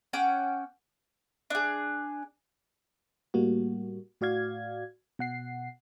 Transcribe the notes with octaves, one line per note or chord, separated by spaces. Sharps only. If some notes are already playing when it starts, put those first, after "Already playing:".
C#4 F#5 G5 D6
D4 G#4
A2 G3 A#3 F#4
A2 F#4 D5 F5 G#6
B2 F#5 C7